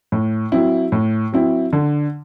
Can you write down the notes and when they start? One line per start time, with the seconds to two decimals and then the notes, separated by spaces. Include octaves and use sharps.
0.12 A2
0.52 F#3 C4 E4
0.92 A2
1.33 F#3 C4 E4
1.73 D3